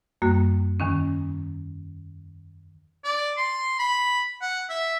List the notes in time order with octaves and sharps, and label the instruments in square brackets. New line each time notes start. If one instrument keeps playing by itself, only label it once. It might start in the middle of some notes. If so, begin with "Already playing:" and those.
[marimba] F#2 G3 A#3 F#4
E2 D#3 C#4
[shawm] D5
C6
B5
F#5
E5